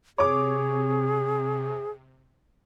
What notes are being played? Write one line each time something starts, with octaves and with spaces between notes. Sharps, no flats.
C3 G#4 C#5 D6